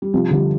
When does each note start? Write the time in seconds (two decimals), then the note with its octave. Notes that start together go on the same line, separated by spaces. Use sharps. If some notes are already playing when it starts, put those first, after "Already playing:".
0.02 G3
0.14 C3 F3
0.31 D3 G3